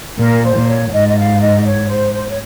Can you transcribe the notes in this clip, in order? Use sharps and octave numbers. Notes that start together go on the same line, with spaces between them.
A#2 A#4
C5
A#2
C#5
G#2 D#5
D#5
F5
D#5
C#5
C5
C5
C#5